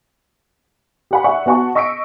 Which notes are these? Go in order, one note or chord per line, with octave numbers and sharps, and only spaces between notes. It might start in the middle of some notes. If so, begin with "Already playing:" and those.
G4 F#5 B5
D5 E5 F#5 C#6
B3 F#4 F#5 A5 C#6
D#5 C#6 E6 B6 C#7 D7